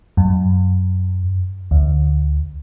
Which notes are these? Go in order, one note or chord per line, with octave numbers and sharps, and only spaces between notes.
F#2
D2